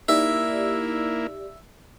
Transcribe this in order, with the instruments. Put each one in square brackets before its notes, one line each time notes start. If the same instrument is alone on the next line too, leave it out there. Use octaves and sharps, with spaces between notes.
[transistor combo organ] A#3 E4 [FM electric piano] D#4 G4 D5 [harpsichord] E5